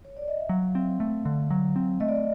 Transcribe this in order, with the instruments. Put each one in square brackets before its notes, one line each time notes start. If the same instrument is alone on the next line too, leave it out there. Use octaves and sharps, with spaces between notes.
[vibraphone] C#5
D5
D#5
E5
[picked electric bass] F#3 [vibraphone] F5
[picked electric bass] C4
A3
D3
F#3
C4
[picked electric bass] A3 [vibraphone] D#5
[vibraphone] D5
D#5